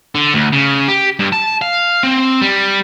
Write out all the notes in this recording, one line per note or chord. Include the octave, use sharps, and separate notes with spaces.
D3
D2
C#3
G4
G2
A5
F5
C4
G3